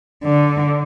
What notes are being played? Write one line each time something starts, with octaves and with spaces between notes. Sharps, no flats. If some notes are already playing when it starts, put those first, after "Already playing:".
D3